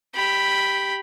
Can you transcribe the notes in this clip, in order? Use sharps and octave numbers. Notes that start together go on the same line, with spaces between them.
G4 B5